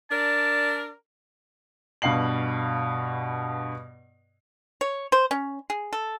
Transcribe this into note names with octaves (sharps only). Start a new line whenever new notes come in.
D4 A#4 D5 A5
G2 B2 F5 C7 F#7
C#5
C5
C#4
G#4
A4